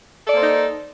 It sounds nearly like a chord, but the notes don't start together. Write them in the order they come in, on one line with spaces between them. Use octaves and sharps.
A4 D5 A#3 C5 D#4